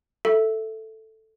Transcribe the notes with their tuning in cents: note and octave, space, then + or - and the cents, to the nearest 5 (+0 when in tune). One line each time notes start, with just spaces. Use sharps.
A4 +0 E5 +0